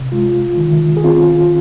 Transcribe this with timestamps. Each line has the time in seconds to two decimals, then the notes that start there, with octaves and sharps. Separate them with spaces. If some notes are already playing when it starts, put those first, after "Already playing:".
Already playing: C3
0.12 G#3 F4
0.58 D#3
0.97 G#4
1.04 C4 F4